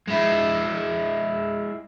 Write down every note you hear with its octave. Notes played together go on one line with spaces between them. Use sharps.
G#3 E4